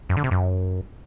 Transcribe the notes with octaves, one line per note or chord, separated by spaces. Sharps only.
F#2
D3
C3
F#2